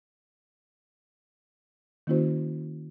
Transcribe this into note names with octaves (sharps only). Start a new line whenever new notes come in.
D#3 A#3 C#4 E4 F#4 C5